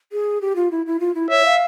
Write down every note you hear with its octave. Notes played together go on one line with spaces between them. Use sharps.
G#4
G4
F4
E4
E4
F4
E4
C#5 E5
F5